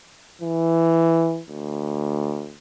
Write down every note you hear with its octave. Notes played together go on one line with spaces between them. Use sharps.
E3
D2